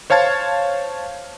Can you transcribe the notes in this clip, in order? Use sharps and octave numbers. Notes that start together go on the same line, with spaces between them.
C5 C#5 F5 A5 G#6